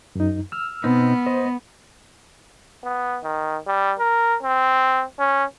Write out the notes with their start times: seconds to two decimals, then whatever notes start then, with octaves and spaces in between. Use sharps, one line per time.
0.15 F#2 D#4
0.52 E6 F6
0.84 B2 B3 C4 D#4
1.27 C5 D#5
2.84 B3
3.23 D#3
3.67 G3
3.99 A#4
4.43 C4
5.19 C#4